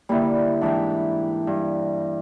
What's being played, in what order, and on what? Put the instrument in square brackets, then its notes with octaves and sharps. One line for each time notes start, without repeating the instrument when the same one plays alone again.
[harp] D3 A#3 [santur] G3 E4
[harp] G#2 E3 [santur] D4 E5 G5
[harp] G2